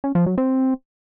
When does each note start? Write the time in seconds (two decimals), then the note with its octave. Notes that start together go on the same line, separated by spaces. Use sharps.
0.04 C#4
0.15 F3
0.26 F#3
0.38 C4